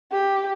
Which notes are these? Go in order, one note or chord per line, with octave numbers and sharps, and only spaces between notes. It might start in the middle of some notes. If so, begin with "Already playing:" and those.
G4